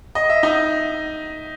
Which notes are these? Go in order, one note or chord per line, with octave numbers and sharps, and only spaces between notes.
D#5
E5
D#4 D#5